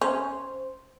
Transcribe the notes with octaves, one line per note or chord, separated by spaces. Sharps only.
C#4 C5